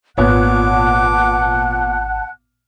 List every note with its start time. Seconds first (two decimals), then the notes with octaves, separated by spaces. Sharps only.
0.18 G#1 A#2 B3 C#5 F#5 A5 D6 F#6